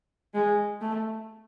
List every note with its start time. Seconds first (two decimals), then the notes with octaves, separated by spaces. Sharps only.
0.34 G#3
0.81 A3